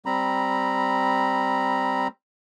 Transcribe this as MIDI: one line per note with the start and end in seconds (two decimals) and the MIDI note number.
0.06 2.08 55
0.06 2.08 60
0.06 2.08 82
0.06 2.08 83